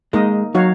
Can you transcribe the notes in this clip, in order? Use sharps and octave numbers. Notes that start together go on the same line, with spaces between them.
G#3 A#3 D#4 A#4 D#5
F#3 D#4 F#4 C#5 F5